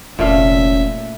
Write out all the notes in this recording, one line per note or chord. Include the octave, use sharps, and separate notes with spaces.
F1 A#2 A3 C#4 E5 F5